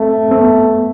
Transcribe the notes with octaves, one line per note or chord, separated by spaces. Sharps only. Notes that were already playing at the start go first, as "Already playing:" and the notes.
Already playing: A3 C4
C4
B3